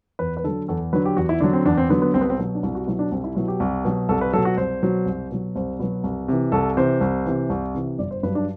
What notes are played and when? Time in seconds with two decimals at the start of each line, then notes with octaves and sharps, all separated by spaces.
0.19 E2 B4
0.37 B4
0.44 D3 F#3 A4
0.68 E2 A4
0.93 D3 F#3 B4
1.05 G4
1.17 E2 F#4
1.29 E4
1.40 D3 F#3 D4
1.53 C4
1.66 E2 D4
1.77 C4
1.89 D3 F#3 B3
2.02 B3
2.14 C2 C4
2.21 B3
2.30 C4
2.39 B2 F#3
2.55 D4
2.63 C2 E4
2.75 F#4
2.87 B2 F#3 E4
2.99 D4
3.11 C2 C4
3.24 E4
3.36 B2 F#3 E4
3.48 G4
3.60 C2
3.85 B2 F#3
4.09 C2 A4
4.21 B4
4.33 B2 F#3 A4
4.45 F#4
4.57 C2 C5
4.83 B2 F#3
5.06 C2
5.31 B2 F#3
5.55 C2 C5
5.79 B2 F#3 B4
6.04 C2
6.28 C3 E3
6.52 C2 A4
6.77 C3 E3 C5
7.01 C2
7.26 C3 E3
7.50 C2
7.74 C3 E3
7.99 G1 D5
8.11 C5
8.23 G2 F#3 B4
8.35 D4